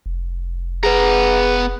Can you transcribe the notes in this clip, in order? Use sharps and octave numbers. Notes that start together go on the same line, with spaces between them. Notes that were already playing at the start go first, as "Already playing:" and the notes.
F1
B3 G#4 B4 A#5